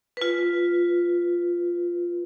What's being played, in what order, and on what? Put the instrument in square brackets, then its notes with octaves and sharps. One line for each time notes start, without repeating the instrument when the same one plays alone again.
[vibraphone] F4 B4